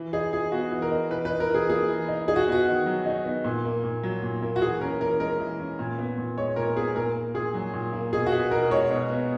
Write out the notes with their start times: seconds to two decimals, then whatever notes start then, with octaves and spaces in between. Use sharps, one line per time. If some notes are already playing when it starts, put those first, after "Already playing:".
Already playing: E3
0.13 D#4 G#4
0.33 E3 G#4
0.52 B3 F#4
0.72 E3
0.82 A#4
0.91 D#4
1.11 E3 B4
1.25 B4
1.30 D#4
1.40 A#4
1.50 E3 G#4
1.69 A#3 G#4
1.89 E3
2.08 D#4
2.28 D#4 G#4
2.36 F#4
2.47 B3
2.52 F#4
2.67 D#3
2.86 F#3
3.06 D#4
3.25 B3
3.44 A#2
3.65 A#3
3.84 A#2
4.03 F#3
4.23 A#2
4.42 A#3
4.56 F#4
4.62 E3 G#4
4.81 C#4 A#4
5.00 E3 A#4
5.20 G#3 A#4
5.40 E3
5.59 C#4
5.79 A#2
5.98 B3
6.18 A#2
6.37 G#3 C#5
6.56 A#2 A#4
6.76 B3 G#4
6.95 A#2 A#4
7.15 A#3
7.35 A#2 G#4
7.54 F#3
7.74 A#2
7.93 A#3
8.13 B2 G#4
8.27 F#4
8.32 B3 G#4
8.51 B2 A#4
8.71 G#3 C#5
8.91 B2
9.10 B3